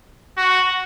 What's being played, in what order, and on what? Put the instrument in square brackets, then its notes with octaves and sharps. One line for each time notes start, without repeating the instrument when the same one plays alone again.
[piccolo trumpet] F#4